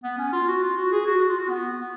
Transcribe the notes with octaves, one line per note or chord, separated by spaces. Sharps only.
B3
C#4
F4
F#4
F4
F#4
G#4
F#4
F#4
F4
F#4
B3
B3